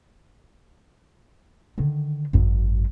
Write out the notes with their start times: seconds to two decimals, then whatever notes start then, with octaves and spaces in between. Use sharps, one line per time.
1.78 D3 D#3
2.33 G#1 F#2